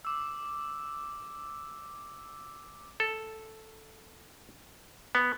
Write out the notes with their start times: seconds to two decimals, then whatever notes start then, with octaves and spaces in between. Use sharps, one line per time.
0.05 D6 E6
3.00 A4
5.15 B3